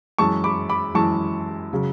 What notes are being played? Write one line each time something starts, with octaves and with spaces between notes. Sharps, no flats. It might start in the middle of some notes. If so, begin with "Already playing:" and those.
F#2 E3 G#3 A5 C#6
B5 D6
B5 D6
F#2 E3 G#3 A5 C#6
C#3 F#3